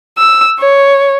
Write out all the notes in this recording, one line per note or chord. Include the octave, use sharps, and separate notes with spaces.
E6
C#5